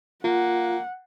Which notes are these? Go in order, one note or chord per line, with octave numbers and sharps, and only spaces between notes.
A#3 F4 F#5